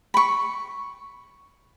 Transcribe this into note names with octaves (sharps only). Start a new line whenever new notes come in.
B5 C#6